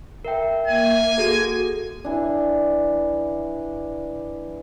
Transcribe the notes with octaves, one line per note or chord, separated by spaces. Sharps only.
A#4 E5 G5
A#3 E5 G#5
F#4 G#4 A4
E3 D4